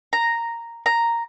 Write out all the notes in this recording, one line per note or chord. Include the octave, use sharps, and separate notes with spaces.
A#5
A#5